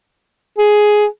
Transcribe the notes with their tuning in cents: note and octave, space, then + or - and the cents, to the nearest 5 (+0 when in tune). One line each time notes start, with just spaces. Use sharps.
G#4 +10